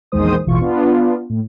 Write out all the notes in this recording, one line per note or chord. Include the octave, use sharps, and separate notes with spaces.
A#1 E2 D#3 G#3 C5 D#6
A1 E2 B2 F4 C#6
B3 D4 F4
A2